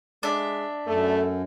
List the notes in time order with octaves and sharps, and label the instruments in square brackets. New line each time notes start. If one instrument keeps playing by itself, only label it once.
[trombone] G#3 [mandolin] D4 E5
[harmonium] F#2 [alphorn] A3 [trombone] A4